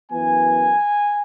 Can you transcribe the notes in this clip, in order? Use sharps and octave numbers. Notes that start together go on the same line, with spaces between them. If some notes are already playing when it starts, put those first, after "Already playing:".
F#2 E3 B3 G#5